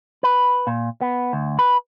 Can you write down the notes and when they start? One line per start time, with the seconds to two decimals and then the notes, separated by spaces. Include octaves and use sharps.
0.23 B4
0.67 A#2
1.01 B3
1.33 D2
1.59 B4